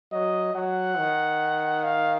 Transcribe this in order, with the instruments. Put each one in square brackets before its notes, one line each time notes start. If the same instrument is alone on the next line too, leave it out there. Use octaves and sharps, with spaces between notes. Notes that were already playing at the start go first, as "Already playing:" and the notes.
[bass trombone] F#3 [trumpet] D#5
[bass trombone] F#3 [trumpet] F#5
[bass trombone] D#3
[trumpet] F5